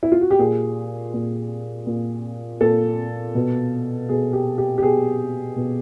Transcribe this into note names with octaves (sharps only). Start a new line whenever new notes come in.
E4
F4
F#4
G4
A#2 G#4
A#2
A#2
A#2 A4
B2
B2 G#4
G4
G4
G4
B2 G#4
B2